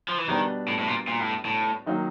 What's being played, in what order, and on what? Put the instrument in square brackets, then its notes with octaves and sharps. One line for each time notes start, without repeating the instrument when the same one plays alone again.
[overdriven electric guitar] F3
E3
[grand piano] B2 G3 B3 D4 [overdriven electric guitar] D#3
[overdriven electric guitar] A2
A2
A#2
A#2
A2
A2
[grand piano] D#3 F#3 A#3 D#4